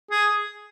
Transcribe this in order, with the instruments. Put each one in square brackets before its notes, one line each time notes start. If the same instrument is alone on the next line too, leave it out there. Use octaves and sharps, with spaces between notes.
[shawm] G#4